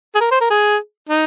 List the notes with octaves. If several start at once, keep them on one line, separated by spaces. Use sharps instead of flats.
G#4
A#4
C5
A#4
G#4
D#4